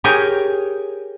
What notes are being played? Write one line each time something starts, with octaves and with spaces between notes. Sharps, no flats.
G4 G#4 A#4 C#5 G5